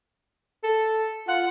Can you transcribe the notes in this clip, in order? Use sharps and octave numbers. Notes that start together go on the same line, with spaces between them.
A4
F4 F#5